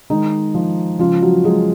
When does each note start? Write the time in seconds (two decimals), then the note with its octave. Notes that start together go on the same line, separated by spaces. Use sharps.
0.10 D#3 G#3 D#4
0.54 F3
0.99 C#3 F3 F4
1.22 F#3 F#4
1.44 F#3 G#3 G#4